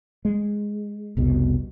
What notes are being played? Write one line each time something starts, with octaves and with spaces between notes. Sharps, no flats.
G#3
F1 C2 B2